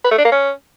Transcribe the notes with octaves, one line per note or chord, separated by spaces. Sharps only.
B4
A3
D4
A#3
C#4